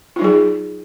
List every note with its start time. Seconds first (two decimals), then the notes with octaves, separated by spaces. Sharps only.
0.16 F4
0.19 D#4
0.22 F#3
0.24 G#4